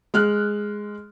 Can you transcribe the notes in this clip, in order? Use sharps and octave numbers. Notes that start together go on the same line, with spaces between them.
G#3 F6 F#6